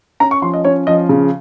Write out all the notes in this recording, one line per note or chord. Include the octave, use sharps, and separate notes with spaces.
C#4 A#5
C#6
F3 C6
D#5
C#4 C#5
F3 D#5
C#3